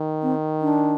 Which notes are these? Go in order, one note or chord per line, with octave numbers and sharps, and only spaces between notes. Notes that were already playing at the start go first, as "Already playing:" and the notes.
Already playing: D#3
C4
D4